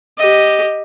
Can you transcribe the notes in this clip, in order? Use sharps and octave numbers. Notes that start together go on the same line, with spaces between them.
G4 D#5